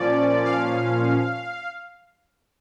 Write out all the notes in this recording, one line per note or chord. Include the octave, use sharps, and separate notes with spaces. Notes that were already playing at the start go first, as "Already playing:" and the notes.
Already playing: A#2 F3 C#4 D5
F5